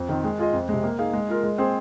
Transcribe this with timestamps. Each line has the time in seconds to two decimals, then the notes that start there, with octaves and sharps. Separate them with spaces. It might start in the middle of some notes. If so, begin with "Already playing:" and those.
Already playing: F2
0.09 D#3 C4
0.24 G#3
0.39 F4 G#4 D#5
0.53 F2
0.69 C3 G#3
0.84 A#3
0.99 D#4 G#4 F5
1.13 G#3
1.29 F4 A#4
1.44 G#3
1.58 C4 G#4 C5